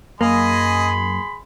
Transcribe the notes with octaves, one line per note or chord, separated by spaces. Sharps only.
F#2 A#3 G#4 D#5 G#5 B5 C6